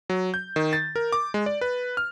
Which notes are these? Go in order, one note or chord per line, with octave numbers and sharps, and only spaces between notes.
F#3
G6
D#3
A6
A#4
D6
G#3
D5
B4
F6